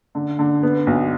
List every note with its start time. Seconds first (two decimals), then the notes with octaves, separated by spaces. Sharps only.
0.15 D3
0.39 D3
0.63 B3
0.86 B1